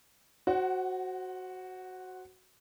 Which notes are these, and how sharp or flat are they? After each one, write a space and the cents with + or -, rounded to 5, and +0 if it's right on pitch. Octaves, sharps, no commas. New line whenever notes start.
F#4 +0 C5 +15 F#5 +30